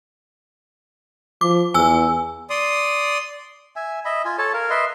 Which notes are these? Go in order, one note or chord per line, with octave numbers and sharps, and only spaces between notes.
F3 D6
E2 G#5 E6
D5 C6 D#6
E5 G#5
D#5 E5 B5
F4 G#5
A4 C#5 A5
A#4 F5
B4 D#5 E5 C6